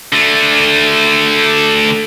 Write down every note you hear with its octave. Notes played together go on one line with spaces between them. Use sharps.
D3 A3